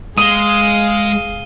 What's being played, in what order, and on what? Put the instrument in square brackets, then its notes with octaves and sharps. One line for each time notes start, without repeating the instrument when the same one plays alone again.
[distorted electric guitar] G#3 [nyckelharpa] G#4 F5 [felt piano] D#6 [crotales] D#7 G7